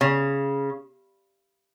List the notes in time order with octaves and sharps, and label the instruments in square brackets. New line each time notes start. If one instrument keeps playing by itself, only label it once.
[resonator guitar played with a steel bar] C#3